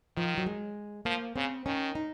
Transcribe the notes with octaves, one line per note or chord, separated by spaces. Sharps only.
D#3 F3
F#3
G#3
F3 A#3
C#3 C4
D#3 C#4
D#4